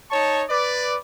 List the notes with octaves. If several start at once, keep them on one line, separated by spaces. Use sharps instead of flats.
D#4 C#5 A5 C#6
B4 D5